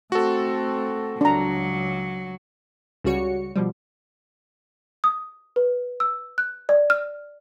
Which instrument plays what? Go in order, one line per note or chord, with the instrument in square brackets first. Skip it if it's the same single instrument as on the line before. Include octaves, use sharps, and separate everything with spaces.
[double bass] A3 C4 [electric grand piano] F#4 A4
[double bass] C#2 [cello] F#3 [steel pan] D4 A#5
[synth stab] C#2 C#3 G3 F#4 C#5 C#7
B2 F3 G3
[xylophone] D#6
B4
E6
F#6
D5
F6